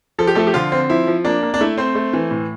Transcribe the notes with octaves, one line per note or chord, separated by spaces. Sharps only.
F3 A4
G4
F3 A3 A4
G4
D3 F3 F4
C4
F3 E4
F3
A#3 D4
A#3
D4
A3 E4
C4 C5
A3
E3
A2